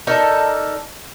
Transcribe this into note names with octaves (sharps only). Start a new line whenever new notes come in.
D#4 A4 A#4 D5